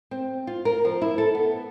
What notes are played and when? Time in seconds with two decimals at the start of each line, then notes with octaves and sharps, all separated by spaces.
0.11 C4
0.47 F4
0.65 A#4
0.85 F3
1.02 E4
1.18 A4
1.35 B3